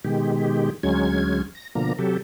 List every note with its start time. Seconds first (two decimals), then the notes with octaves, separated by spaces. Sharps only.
0.04 B2 D#3 G#3 G4
0.83 D2 F#3 G#3 C#4 G#6
1.55 A#6
1.75 B2 D3 F3 A#3 A#5
1.99 C3 F#3 G4 A4